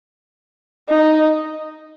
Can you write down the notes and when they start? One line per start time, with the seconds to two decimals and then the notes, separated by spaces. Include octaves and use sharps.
0.89 D#4